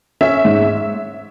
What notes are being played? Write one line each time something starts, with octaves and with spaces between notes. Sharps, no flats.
C#4 E5
G#2